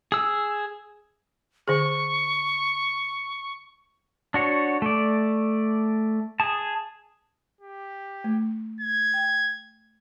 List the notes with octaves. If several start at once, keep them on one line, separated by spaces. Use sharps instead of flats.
G#4 E6
D3 G#4 C#6
D4 F#4 C#5
A3 D5
G#4 A5
G4
A3
G#6
G5